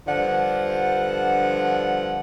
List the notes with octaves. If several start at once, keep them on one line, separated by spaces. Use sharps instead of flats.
G2 D3 F3 F#5